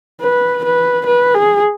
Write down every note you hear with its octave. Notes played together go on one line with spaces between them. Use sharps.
B4
B4
B4
G#4